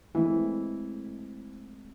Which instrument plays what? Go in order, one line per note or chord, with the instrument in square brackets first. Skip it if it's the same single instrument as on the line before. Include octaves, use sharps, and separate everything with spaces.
[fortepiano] E3 [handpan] G#3 A3 C4